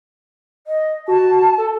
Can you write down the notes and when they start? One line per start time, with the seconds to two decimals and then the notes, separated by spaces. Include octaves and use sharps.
0.67 D#5
1.08 F#4 A5
1.58 A4